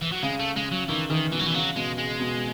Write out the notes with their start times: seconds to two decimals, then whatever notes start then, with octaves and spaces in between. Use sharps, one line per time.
0.02 E3
0.12 F#3
0.22 C#3 G#3
0.39 A3
0.55 C#3 G#3
0.72 F#3
0.89 D#3 E3
1.10 D#3 E3
1.32 B2 E3
1.39 F#3
1.46 E3
1.54 C#3 F#3
1.76 B2 G#3
1.98 G#3
2.20 B2